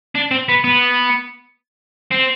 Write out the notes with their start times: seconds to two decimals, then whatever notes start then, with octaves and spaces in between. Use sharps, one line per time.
0.15 D4
0.31 C4
0.49 B3
0.64 B3
2.11 C4